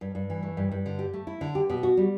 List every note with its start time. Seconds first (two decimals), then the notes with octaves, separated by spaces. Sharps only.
0.01 G2
0.15 G2
0.30 E3
0.43 A3
0.57 G2
0.71 G2
0.86 D3
0.99 G4
1.13 A3
1.27 E4
1.41 D3
1.55 G4
1.70 B2
1.83 F#4
1.97 G3